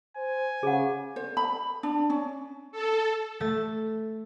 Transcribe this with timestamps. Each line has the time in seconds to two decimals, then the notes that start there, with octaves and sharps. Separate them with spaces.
0.17 C5 G#5
0.63 C#3 G#4 F#5
1.16 C5
1.37 B5
1.83 D4
2.10 C#4
2.72 A4
3.40 A3 A6